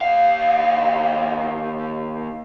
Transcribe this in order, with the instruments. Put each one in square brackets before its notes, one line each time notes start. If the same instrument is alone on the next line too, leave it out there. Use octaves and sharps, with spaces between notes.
[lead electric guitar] D#2 F5